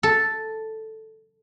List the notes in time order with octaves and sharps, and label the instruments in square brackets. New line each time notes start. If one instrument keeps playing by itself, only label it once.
[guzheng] A4